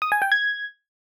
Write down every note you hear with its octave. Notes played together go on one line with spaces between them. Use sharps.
D#6
G#5
G5
G#6